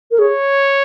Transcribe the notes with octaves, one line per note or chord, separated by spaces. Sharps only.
A#4
G#4 C#5